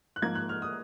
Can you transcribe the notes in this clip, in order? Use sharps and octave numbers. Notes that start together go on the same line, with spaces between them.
F#6
G#2 F3 A#3 G#6
F#6
F6
D#6